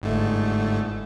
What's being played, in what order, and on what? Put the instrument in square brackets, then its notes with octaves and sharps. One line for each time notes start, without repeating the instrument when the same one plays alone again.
[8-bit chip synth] G1 G#2 A3